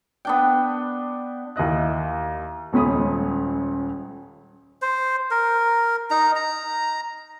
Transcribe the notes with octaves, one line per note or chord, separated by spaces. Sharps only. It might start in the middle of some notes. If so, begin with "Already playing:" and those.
B3 D4 G5
D#2 E4 D#5 F#6
D#1 C#2 C#4 B5 D#6
C5
A#4
D#4 A#5
A#5